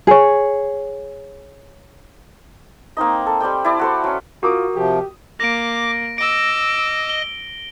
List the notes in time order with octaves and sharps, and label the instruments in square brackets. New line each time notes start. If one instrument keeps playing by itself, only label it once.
[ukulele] G#4 C#5
[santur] A#3 C4 D#4 D#5
A4
G3 C4 D5 G5
E4 D5
F#4 A4 C5
F#3 C#4
[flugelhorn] F4 [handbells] F#4 [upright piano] A#4 D6 D#6
[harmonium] C3 F3 [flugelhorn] G4
[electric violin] A#3 [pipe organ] D6 [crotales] A#6 D7
[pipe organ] D#5 [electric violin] D6 E6 [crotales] D7
[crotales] G7